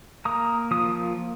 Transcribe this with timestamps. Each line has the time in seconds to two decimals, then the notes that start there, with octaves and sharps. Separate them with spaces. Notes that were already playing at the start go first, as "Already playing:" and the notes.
0.25 A#3 A#5 D#6
0.71 F3 D#6